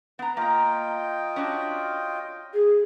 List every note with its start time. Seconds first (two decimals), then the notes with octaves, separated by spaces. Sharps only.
0.19 B3 B4 A#5
0.37 A#3 F4 D#5 G5 A#5
1.36 C#4 D4 F#4
2.54 G#4